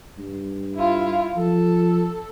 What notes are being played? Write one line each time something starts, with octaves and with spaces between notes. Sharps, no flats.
G2
E4 F4
F3 A4